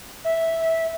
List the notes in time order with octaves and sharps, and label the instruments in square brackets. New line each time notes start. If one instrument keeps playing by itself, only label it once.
[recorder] E5